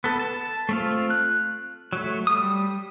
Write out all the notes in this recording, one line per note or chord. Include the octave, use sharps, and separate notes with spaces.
B3 A4
A5
A3 C4 F4
F#6
F#3 A3
G3 D#6